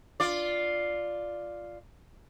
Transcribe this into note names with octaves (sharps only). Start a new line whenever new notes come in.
F4 D5